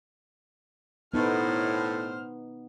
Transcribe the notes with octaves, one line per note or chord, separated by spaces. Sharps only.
A2 B3 D#4 C5 F6